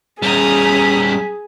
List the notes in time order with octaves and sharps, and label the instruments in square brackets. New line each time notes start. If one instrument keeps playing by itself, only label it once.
[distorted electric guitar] G3 C#4 [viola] G#4 [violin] A#5 D#6 [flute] B6